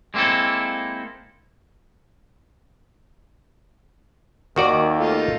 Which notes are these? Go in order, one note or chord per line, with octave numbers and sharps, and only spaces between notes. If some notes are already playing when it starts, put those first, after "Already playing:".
G#3 A#3 C4 E4 A4
D#2 D#3 F#4 D5
A3 D#4 F4